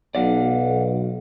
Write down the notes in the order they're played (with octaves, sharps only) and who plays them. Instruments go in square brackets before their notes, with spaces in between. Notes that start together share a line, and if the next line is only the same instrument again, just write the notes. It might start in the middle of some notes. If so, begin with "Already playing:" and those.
[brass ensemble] B1 [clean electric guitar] D5 F5 F#5